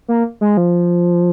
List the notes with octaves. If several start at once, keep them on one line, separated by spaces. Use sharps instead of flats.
A#3
G#3
F3